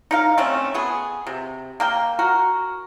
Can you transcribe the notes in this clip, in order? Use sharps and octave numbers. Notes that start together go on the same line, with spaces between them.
D#4 A#4 F5
A3 C4 C#4
B3 G#4
C3
A#3 A#4 G5
F#4 A#4